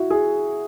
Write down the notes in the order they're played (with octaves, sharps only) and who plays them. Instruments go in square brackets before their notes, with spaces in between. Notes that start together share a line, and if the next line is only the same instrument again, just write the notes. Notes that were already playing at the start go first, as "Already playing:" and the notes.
Already playing: [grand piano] E4 F#4
G#4